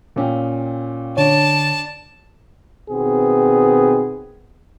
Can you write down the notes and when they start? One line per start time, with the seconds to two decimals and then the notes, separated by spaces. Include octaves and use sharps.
0.16 A#2 C#4 G5
1.17 D3 D4 C#5 A5
2.91 B2 D#3 B3 C4 G#4